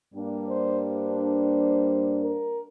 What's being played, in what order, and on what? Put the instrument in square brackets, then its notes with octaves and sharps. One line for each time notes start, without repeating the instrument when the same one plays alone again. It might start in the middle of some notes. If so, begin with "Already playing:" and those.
[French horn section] G2 G3 A#3 D4
C5
C5
A#4